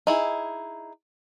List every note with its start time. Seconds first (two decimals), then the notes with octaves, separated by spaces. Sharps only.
0.07 D#4 E4 G#4